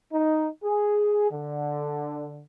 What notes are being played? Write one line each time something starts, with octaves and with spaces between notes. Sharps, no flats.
D#4
G#4
D3